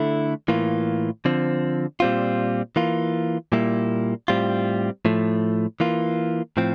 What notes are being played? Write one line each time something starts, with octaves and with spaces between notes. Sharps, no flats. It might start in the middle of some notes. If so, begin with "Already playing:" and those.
Already playing: D3 A3 E4
A2 E3 A#3 F4
D3 F3 C4
A#2 G3 C4 F4
E3 A#3 F4
A#2 G3 A#3 E4
A2 G3 C4 F4
A2 F3 A3
E3 A#3 F4
A2 F3 C4